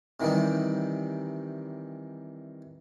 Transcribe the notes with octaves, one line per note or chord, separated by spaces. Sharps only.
C3 D#3 E3 G3 D#4